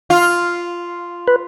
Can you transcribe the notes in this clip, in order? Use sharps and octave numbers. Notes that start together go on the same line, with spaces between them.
F4
B4